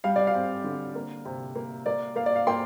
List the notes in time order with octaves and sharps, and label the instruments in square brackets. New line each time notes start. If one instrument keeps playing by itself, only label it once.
[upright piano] G3 F5
D5
F5
C4
D3
A#3
C3
A#3
A#3 D5
A#3 F5
D5
F5
A#3 G5 C6